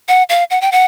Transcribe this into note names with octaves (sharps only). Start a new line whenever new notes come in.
F#5
F5
F#5
G5
F#5